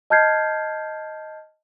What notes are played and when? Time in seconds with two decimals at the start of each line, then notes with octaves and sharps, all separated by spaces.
0.10 D#5 A5 F6 G6 G#6 C7